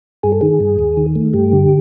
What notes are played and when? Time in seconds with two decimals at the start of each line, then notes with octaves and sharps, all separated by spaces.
0.23 G2 G#4
0.32 A4
0.41 D#3 G#4
0.60 G2
0.79 D#2
0.97 D#3
1.15 A3
1.33 G2 G4
1.53 D3